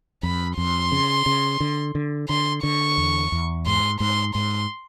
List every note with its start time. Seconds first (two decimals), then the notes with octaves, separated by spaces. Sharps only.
0.23 F2 B5
0.57 F2 C6
0.92 C#3
1.26 C#3
1.60 D3
1.95 D3
2.29 D3 C6
2.63 D3 C#6
2.98 E2
3.32 E2
3.67 G#2 C6
4.00 G#2 C6
4.35 G#2 C6